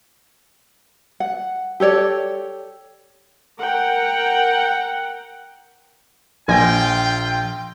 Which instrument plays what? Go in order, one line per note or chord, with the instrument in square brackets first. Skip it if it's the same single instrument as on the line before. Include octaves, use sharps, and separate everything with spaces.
[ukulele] F#5
G4 A4 C#5 D5
[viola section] A#4 F#5 G5
[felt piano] A#1 G#5 A#6 [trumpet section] F4 G5